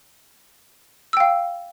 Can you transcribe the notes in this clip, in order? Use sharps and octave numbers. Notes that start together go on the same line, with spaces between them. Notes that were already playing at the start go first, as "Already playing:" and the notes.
F5 G5 E6